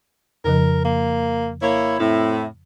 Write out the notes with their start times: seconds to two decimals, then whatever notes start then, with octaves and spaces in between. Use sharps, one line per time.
0.45 F2 C#3 F3 A#4
0.85 A#3
1.62 A#3 E4 C#5
2.00 A2 C4 E4